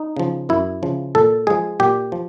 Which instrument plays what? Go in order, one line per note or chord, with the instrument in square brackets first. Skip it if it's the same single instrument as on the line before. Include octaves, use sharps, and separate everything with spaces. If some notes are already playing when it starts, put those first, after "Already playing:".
Already playing: [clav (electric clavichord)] D#4
C#3 F3
F#2 E4
C#3 F3
A#2 A4
F3 G#3 G#4
A#2 G4
F3